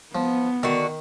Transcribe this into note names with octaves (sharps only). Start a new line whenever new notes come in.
F3 B3
D3 D#3 F#4